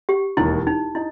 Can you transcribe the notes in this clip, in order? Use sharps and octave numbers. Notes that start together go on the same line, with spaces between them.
G4
E1 D#2 D#3 E4
D#4
D#4 E4